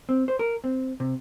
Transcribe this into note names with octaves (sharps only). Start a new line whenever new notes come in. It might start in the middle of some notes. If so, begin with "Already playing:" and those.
C4
C5
A#4
C4
C3